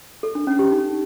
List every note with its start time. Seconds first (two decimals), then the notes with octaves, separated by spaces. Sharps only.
0.23 A4
0.35 D4
0.47 C#4
0.59 G4
0.71 D#4